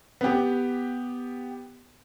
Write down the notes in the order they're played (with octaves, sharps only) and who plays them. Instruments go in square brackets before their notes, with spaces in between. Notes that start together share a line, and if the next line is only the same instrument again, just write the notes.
[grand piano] B3 G4